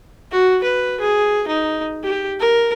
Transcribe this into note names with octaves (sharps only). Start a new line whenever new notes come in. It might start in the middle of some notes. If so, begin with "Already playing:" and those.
F#4
B4
G#4
D#4
G4
A#4